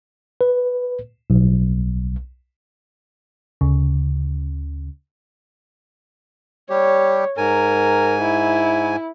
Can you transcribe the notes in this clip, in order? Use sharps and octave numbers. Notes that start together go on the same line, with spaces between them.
B4
B1
D2 C#3
G3 G4 C#5
G#2 A#4 G#5
E4